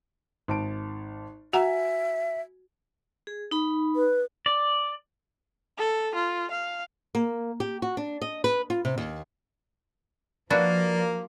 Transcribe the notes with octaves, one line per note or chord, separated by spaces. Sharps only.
G#1 A5 D7
F#4 E5 F#5 G#5 A#5
G#4
D#4 B5
B4
D5
A4
F4
F5
A#3
G4
F#4
D4
D#5
B4
F4
C3
D#2
F3 A#3 D4 E4 F#4 B4 D5 A6